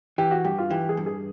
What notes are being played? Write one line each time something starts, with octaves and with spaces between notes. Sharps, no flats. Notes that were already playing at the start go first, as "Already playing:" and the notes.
E3 G4
F#4
G2 G4
F4
E3 G4
G#4
G2
G#4